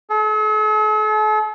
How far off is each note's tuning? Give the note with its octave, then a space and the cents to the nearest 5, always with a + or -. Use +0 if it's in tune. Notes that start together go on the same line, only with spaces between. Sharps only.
A4 -45